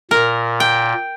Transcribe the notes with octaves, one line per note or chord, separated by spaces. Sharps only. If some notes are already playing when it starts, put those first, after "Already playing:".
A#2 A#4
G5